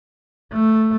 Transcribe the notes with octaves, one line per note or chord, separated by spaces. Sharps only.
A3